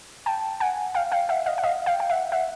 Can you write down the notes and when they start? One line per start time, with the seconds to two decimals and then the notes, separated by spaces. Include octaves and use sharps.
0.26 G5 A5
0.60 F#5 G#5
0.95 F5 G5
1.12 F5 G5
1.29 E5 F#5
1.46 D#5 F5
1.58 F#5
1.63 D#5 F5
1.86 F5 G5
2.00 G5
2.10 E5 F#5
2.32 E5 F#5